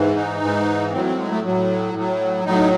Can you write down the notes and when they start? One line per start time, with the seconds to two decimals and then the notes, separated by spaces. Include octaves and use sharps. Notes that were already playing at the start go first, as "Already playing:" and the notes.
Already playing: G#2 E3
0.17 D#4
0.42 G#2 E3
0.93 A2 F#3 C4
1.05 C4
1.18 G#3
1.31 A3
1.44 A2 F#3
1.94 A2 F#3
2.45 A2 F#3 D#4